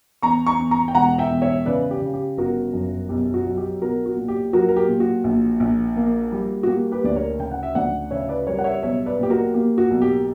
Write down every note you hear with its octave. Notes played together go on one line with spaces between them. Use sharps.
E2 A#5 C#6
A#5 C#6
E2
A#5 C#6
G5
E1 F#5 A#5
E5 G5
E2
C#5 E5
C#3 B4 D5
G4
C#3
G4
G1 F#4 A#4
F#2
B1 G4
F#4
F#3
G4
B1 F#4 A#4
F#4
A#2
G4
F#3 F#4 A#4
A#4
G4
A#2
F#4
A#1
A#1
A#3
G3
F#4
A#3 G4
G4 B4
D2 D5
A#4 C#5
C#3 G5
F#5
E5
D2 D5 F#5
C#3 C#5 E5
B4 D5
G3 A#4 C#5
F#5
C#5 E5
B1 C#5 E5
B4 D5
A#2 G4
F#4 A#4
A#3 G4
F#4
B1
G4